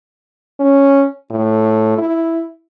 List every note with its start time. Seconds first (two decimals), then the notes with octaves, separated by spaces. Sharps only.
0.60 C#4
1.30 A2
1.98 E4